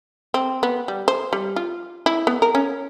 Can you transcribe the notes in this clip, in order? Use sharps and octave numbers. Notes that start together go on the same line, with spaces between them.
C4
B3
G3
C5
G3
F4
E4
B3
A#4
C#4